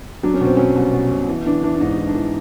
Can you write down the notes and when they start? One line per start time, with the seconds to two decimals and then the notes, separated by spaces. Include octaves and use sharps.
0.23 F#3 D4
0.34 C#4
0.41 B2 C4
0.57 F#3 C#4
0.75 C2
0.93 B2
1.11 B2
1.28 E3
1.46 E3 D4
1.63 E3 D4
1.75 D4
1.81 G#2 D#4
1.98 E3
2.07 D4
2.15 E3